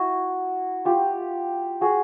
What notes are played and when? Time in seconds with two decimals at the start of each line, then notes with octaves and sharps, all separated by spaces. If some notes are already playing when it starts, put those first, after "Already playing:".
Already playing: E4 F#4
0.85 F4 G4
1.81 F#4 G#4